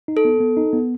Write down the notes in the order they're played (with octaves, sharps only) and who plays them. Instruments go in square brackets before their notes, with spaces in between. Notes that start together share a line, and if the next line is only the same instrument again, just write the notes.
[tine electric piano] D#4
[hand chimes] A4
[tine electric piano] B3
B3
D#4
B3